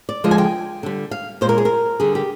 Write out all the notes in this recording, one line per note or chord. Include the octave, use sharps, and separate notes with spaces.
D5
D3 F3 G#3 D#5
G#5
G5
D3 G3
F5
A#2 G#3 C5
A#4
G#4
A#4
D3 G3 G#4
G4